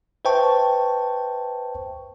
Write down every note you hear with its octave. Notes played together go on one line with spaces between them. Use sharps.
B4 C5 E5 G5 A5 C#6